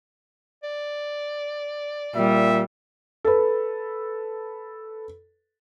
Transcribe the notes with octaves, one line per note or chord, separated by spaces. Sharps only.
D5
A#2 G3 E5
A4 B4